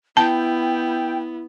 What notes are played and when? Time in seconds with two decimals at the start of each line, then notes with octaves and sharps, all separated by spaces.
0.17 B3 E4 G5 A5